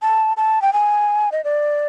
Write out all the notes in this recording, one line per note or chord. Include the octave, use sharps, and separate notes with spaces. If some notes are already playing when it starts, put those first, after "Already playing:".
A5
A5
G5
G#5
D#5
D5